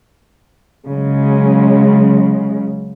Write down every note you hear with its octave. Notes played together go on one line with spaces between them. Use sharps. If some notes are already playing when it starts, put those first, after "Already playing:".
C#3 F#3 G#3